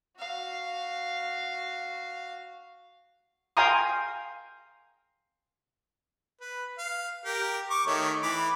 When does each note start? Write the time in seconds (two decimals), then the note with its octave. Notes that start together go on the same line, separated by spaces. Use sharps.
0.17 F#4 F5
3.57 F5 G5 G#5 A#5 C6 D#6
6.41 B4
6.78 F5
7.25 G4 A#4
7.70 C#6 D6
7.87 D#3 A3 C#5
8.23 E3 B5 D6